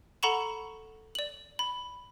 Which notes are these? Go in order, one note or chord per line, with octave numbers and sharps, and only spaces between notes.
A4 F#5 A#5 B5 C#6 E7
D5 F#7
B5